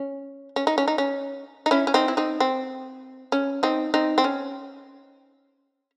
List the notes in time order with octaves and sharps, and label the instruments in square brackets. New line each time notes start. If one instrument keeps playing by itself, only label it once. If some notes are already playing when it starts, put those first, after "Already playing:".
Already playing: [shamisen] C#4
C#4
D#4
C#4
D#4
C#4
D#4
C#4 E4
C#4
C4 D#4
E4
C4 D#4
C4
C#4
C4 D#4
C4 D#4
C4
C#4